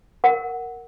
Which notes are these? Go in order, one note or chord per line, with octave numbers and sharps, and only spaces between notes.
A#4 F#5